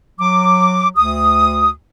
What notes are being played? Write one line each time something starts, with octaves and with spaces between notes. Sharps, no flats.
F#3 D6
D2 D#6